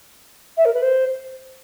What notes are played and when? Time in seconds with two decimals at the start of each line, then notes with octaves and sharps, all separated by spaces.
0.56 E5
0.65 A#4
0.73 B4
0.82 C5